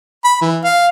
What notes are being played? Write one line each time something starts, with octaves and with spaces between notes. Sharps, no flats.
B5
E3
F5